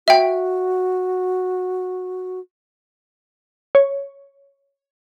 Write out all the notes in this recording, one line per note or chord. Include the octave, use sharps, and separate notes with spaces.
F#4 E5 G5
C#5